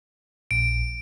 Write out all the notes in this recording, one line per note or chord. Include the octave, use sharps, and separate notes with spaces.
A#1 D7